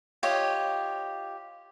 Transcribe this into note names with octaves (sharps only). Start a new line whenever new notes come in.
F4 G4 C#5 D#5